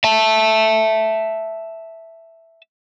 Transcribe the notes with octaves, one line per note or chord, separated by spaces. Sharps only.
E5 A5